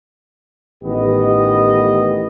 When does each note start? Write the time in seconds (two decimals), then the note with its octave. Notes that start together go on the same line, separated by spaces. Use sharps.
0.84 A1 D#3 B3 G4 D#5